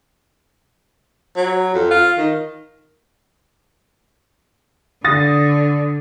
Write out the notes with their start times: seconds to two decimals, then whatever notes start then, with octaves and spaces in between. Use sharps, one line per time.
1.36 F#3
1.75 F2
1.91 F4
2.18 D#3
5.04 D3 D#6 A6 A#6